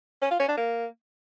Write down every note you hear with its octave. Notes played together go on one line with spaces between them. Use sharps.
C#4
F4
C#4
D4
A#3